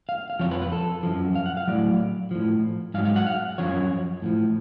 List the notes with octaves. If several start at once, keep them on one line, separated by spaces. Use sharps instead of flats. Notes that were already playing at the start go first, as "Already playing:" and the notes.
F5
F5
F2 F3 C#5
B4
B4
A4
F#2 F3
F5
F#5
F5
A2 F#3 D5
A2 F3
G#2 F#3 F5
F5
F#5
F5
F#2 F3 C#5
A2 F3